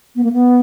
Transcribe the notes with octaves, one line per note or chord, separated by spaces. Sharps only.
B3
A#3
B3